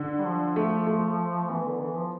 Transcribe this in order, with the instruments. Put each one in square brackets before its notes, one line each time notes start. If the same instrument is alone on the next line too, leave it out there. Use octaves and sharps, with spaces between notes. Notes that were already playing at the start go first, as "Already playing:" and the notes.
Already playing: [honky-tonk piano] D3
[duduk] G3
F3
[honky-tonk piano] A3
A3
[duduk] E3 [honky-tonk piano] B3
[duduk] D3
E3
F3